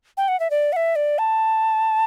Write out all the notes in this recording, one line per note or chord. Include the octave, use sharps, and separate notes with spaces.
G5
F#5
E5
D5
F#5
E5
D5
A5